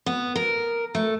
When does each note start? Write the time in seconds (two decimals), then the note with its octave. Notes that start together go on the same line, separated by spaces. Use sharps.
0.06 B3
0.36 A#4
0.95 A3